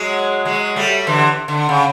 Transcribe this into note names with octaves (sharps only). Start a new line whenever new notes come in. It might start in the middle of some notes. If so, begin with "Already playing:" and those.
Already playing: F#3 G#3
F#3 G#3
G3 A3
D3 E3
D3
C#3